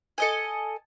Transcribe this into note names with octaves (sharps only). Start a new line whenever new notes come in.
A4 D#5 G#5